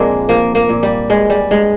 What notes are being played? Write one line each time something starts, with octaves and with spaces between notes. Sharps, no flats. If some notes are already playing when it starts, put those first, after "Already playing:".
Already playing: A#2 F3 G#3 A#3 C4 D4
F3 A#3
A#3
A#2
G3
G2 G#3
G3
G2 G#3